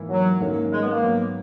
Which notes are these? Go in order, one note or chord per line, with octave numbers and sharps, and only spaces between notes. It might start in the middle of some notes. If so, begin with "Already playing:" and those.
Already playing: G#2 E3 A#3 E4
F#3
G#2 D#3 F#3 A#3 C#4
G#3
B3
A#3
G#2 F#3 B3